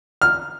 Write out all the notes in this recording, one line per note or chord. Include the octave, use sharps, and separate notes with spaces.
F6